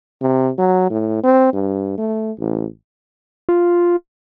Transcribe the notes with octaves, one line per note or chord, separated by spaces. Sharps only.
C3
F#3
A2
C4
G2
A3
A1
F4